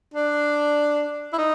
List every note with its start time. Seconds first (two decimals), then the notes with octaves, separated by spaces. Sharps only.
0.14 D4
1.33 E4
1.39 D#4